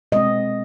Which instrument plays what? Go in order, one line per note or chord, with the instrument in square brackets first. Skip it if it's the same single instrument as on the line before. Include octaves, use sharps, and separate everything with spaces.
[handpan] B2 G#3 C4 D#5